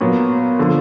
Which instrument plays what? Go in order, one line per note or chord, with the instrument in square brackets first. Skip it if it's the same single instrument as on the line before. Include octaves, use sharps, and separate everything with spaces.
[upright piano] A#2 F#3 B3
D3 F3